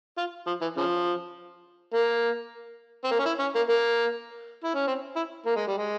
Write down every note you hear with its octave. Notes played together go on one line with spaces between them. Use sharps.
F4
F3
E3
C#3 F3
A#3
C4
A#3
C#4
E4
C#4
A#3
A#3
E4
C#4
C4
E4
A#3
G#3
G3
G#3